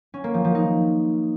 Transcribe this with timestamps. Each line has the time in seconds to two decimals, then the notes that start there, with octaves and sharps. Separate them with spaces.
0.14 C#4
0.24 A#3
0.34 F3
0.45 F3
0.55 D#4